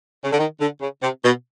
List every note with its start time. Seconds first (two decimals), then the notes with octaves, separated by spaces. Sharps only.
0.24 C#3
0.31 D3
0.38 D#3
0.61 D3
0.81 C#3
1.03 C3
1.24 B2